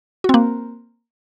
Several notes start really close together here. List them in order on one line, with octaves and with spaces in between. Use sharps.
F#4 C4 A#3